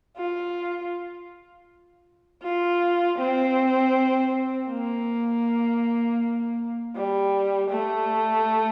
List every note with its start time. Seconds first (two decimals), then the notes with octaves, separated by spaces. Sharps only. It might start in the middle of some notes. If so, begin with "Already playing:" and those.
0.17 F4
2.43 F4
3.19 C4
4.69 A#3
6.96 G3
7.70 A3